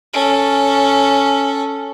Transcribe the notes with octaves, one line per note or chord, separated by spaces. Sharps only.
C#4 A4